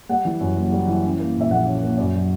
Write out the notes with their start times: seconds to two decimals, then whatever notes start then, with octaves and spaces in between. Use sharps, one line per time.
0.09 G3 F#5
0.25 E3
0.40 F#2
0.56 F#1
0.72 G3
0.87 E3
1.04 C#4
1.19 A#3
1.36 A#2
1.41 E5
1.50 A#1 F#5
1.67 C#4
1.82 A#3
1.97 F#2 D5
2.14 F#3